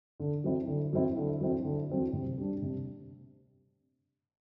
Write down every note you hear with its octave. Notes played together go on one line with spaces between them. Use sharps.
D3
F#3 C4 E4
D3
F#3 C4 E4
D3
F#3 C4 E4
D3
F#3 C4 E4
C3
G3 D4
C3